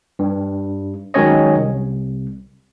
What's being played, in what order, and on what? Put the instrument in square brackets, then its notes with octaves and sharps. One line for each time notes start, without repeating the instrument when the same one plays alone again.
[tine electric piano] G2
D#3 F#3 G#3 C#4 C#5 D#5
C2